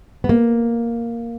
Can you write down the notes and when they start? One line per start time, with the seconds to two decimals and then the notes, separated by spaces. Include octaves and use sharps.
0.24 B3
0.29 A#3